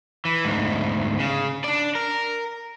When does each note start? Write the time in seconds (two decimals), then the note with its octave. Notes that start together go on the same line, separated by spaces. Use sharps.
0.25 E3
0.45 D2 G#2
1.19 C#3
1.64 D4 D5
1.95 A#4